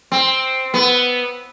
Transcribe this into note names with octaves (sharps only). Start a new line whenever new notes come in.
C4
B3